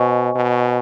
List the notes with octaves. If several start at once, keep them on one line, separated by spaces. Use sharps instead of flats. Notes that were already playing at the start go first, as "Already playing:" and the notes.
Already playing: B2 C5 D#5 G#5 C#6
B2